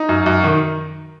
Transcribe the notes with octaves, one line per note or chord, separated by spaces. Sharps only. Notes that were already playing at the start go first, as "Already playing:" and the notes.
Already playing: D#4
F#2
F#2
D#3